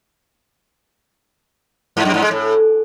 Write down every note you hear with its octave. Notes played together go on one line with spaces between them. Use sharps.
G#2
F#2
G#2
G#3
A2